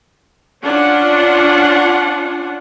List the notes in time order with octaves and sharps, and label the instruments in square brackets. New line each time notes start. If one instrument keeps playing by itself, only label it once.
[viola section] C#4 D4 F4 F#5